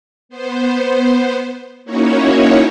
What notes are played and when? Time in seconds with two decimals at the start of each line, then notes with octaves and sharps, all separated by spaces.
0.29 B3 C5
1.85 A#3 C#4 D#4 E4 F#4 C#5